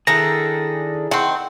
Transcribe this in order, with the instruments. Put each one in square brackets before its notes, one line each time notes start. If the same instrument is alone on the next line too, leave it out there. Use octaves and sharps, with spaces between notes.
[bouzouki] D#3 D4 A4 [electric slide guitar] E4 G#4 [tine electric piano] A#6
[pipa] D#3 C4 [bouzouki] F#5